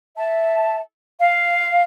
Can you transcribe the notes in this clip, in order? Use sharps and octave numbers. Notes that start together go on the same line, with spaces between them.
E5 A5
F5